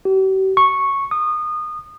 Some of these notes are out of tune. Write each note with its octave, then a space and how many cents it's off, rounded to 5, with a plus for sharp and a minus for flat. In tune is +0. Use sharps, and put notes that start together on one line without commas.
G4 -45
C#6 -5
D#6 -25